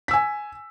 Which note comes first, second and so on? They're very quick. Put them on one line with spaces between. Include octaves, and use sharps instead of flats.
B6 E6 G#5